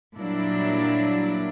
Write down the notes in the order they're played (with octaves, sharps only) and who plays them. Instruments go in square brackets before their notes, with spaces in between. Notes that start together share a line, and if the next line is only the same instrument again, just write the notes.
[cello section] A#2 F#3 G3 A#3 D4 E4